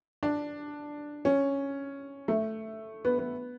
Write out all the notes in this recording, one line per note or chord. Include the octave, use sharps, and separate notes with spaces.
D4
C#4
A3
B3
B3